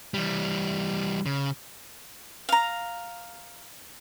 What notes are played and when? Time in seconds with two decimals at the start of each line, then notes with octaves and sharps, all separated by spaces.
0.14 E3 G3
1.26 C#3
2.49 F5 A#5